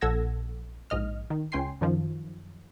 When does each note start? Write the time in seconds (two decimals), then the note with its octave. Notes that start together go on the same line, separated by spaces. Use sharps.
0.01 A#1 A4 F#5 E6 G#6 A#6
0.90 A#1 G#2 D#5 F6
1.30 D#3
1.52 C#2 C#4 G5 G#5 C6 C7
1.81 F#2 D#3 F3